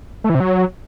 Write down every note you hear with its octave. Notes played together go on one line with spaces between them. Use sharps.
A3
E3
C3
F#3